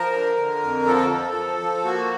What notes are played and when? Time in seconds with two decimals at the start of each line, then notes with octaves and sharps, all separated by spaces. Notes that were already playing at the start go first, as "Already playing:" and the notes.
Already playing: F3 A#4
0.12 D3
0.37 D3
0.62 F2
0.86 F3 A4
1.11 F3
1.36 F3
1.60 F3
1.84 A#3 F#4